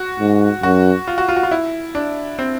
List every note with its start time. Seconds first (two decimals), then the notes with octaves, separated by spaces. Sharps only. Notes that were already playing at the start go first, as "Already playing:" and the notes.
Already playing: F#4
0.20 G#2
0.63 F#2 F#4
1.08 F4
1.18 F#4
1.29 F4
1.36 F#4
1.43 F4
1.51 E4
1.95 D4
2.39 C4